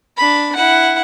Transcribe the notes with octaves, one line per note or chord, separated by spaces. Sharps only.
D4 B5
E4 F#5